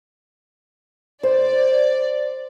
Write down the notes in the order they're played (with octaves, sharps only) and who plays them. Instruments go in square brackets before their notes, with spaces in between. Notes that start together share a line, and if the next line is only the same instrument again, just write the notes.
[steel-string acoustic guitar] C5 [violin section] D5